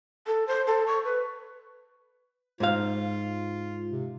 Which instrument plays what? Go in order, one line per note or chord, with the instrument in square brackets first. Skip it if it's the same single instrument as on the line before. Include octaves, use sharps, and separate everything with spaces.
[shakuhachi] A4
C5
A4
C#6
B4
[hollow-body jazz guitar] G#2 F5 [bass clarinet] F4
[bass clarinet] C3